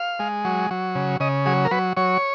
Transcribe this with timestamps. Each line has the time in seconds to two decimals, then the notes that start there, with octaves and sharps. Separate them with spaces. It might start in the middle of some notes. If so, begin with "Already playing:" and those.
Already playing: F5
0.19 G#3
0.45 F#3
0.71 F#3
0.95 C#3
1.20 C#3 D#5
1.46 F#3 G#4
1.65 A#4
1.71 F#3 B4
1.97 F#3 C#5